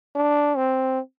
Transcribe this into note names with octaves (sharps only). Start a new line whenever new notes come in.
D4
C4